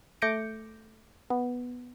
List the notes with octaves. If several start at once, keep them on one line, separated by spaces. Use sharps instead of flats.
A3 D6 G6 A#6 C#7 D7
B3